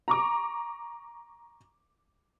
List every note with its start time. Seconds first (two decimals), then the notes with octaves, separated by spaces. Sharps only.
0.08 A#5 C#6 D6